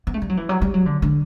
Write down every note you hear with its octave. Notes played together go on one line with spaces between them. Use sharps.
B3
A3
G3
F#3
E3
F#3
G3
F#3
D3
D3